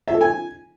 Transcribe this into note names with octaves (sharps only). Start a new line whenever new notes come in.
E5
A4
G#5